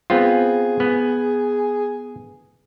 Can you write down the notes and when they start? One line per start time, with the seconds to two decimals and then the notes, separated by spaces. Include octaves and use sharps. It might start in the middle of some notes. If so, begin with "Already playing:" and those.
0.10 B3 C4 F4 G#4
0.80 B3